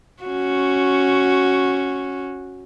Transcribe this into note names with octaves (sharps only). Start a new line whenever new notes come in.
C#4 F#4